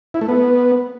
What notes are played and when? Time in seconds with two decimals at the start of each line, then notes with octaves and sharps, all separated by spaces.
0.14 E4
0.21 A3
0.28 B3